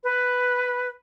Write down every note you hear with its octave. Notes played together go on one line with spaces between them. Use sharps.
B4